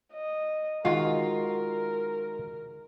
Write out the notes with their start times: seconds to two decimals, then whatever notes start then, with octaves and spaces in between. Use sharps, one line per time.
0.14 D#5
0.85 D#3 G#3 F4 F#4 A#4